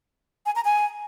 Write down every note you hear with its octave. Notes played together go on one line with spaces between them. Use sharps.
G#5
A#5
G#5